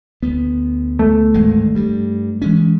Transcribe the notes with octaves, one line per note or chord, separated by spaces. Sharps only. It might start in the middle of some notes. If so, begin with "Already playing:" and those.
D2 B3
A3
G#1 D2 G#3
G2 G3
E3 G#3 C#4